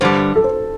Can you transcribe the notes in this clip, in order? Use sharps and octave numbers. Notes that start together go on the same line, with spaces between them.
G2 D3 G3 C5
A4
C5